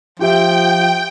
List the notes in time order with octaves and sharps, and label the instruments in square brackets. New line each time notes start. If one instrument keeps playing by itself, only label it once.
[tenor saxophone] F3 [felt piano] F4 G4 E5 [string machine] G5